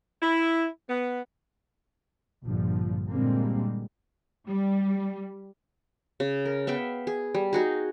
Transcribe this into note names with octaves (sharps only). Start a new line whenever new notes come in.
E4
B3
A#1 G2 D3 F3
A#2 D3 G3 G#3 A#3 C4
G3
C#3
A#4
B3 E5 F5 G5
G#4
G3
D#4 F#4 G#4